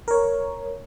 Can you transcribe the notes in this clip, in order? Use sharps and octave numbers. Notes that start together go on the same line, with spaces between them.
A#4 C#5